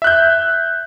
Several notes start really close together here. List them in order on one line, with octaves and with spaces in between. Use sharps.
E5 F#6 G6